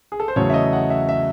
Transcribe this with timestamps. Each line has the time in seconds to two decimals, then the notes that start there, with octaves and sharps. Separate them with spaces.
0.12 G#4
0.20 A4
0.28 C5
0.36 E2 C#3 F#3 A3 C#5
0.50 E5
0.54 D#5
0.73 F#5
0.90 E5
1.09 E5